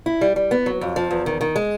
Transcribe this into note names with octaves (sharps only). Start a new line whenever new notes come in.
E4
G3
G3
B3
F#3
F2
F3
E2
D#3
D#3
G#3